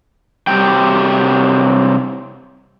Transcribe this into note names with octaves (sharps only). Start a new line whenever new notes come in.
C3 F#3 G3 G5